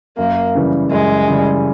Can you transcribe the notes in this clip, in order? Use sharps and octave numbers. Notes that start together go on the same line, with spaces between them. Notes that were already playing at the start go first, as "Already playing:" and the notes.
F#2 A#3
C#3 E3 G3
F#2 G#3
C#3 E3 G3